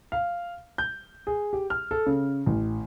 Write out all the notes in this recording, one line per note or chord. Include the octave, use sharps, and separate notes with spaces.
F5
G6
G#4
G4
F6
A4
C#3
A1